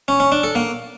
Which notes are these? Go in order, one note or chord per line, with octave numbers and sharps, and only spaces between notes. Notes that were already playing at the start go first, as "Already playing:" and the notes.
C#4
C#4
D4
A4
A#3